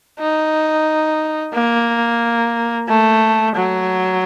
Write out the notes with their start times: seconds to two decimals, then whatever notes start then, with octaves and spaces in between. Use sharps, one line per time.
0.20 D#4
1.54 A#3
2.88 A3
3.56 F#3